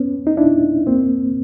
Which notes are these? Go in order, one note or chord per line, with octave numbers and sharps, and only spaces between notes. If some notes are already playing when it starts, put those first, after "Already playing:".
Already playing: B3 C#4
D#4
D4 E4
A#3 C4